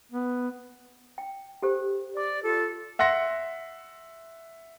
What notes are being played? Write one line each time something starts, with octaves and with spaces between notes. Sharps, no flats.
B3
G5
G4 A4 C5
D5 D6
F4 A4
E5 F#5 C6 A#6 C#7